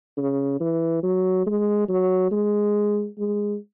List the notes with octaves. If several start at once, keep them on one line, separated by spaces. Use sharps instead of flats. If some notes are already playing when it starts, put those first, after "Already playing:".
C#3
E3
F#3
G#3
F#3
G#3
G#3